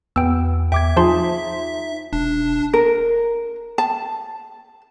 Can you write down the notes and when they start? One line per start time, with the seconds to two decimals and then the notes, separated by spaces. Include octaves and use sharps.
0.16 E2 B3 G5 E6
0.72 E2 E5 G5 D6 G#6
0.97 F3 D#4 G#4 C5 A5 C6
2.13 E1 D4
2.74 A#4
3.78 A5